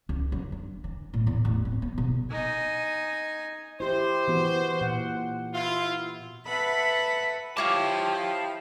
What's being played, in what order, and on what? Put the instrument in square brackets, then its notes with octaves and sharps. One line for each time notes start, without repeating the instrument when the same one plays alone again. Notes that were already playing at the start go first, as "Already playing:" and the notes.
[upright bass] C#2
F#2
D4
E3
A2
E2
A1
C4
B3
B2
[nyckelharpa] D#4 G#5
[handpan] E4 G4 [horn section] C5
[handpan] E3 B3 F#4
A#2 F#5
[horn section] E4 F4
[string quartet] A4 B4 E5 F#5 B5
[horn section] F3 E4 [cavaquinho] F4 C#5 D6 [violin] G4 [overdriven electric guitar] F5 A5